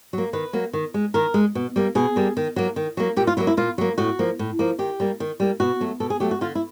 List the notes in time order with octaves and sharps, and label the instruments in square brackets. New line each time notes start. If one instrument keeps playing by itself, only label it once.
[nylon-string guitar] F#3 A#3
D#3 B4
F#3 A#3
D#3
G#3
D#3 A#4
G#3
B2
G3 A#3
B2 G#4
G3 A#3
D#3
F#3 A#3
D#3
F#3 A#3
A#2 G4
F4
F#3 A#3 E4
E4
A#2 F4
F#3 A#3
A2 F#4
F3 A#3
A2
F3 A#3
D#3 G4
G3 A#3
D#3
G3 A#3
B2 F#4
F#3 A3
B2 A4
G#4
F#3 A3 G4
F#4
D3 F4
E4